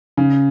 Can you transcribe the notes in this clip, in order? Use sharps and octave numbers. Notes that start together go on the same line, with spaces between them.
C#3